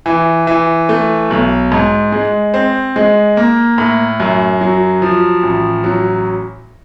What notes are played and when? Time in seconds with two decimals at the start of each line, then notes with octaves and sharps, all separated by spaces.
0.06 E3
0.47 E3
0.89 A3
1.30 B1
1.72 G#2
2.12 G#3
2.54 C4
2.96 G#3
3.37 A#3
3.78 A2
4.20 F#2
4.61 F#3
5.02 F3
5.43 A1
5.84 F#3